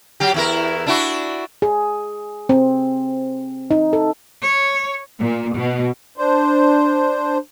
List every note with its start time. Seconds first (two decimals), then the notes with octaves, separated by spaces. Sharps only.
0.20 F#3 G4
0.34 E2 E4 A#4
0.86 D4 E4 F#4
1.62 G#4
2.49 C4
3.71 D#4
3.93 A4
4.42 C#5
5.19 A#2
5.56 B2
6.18 D4 C5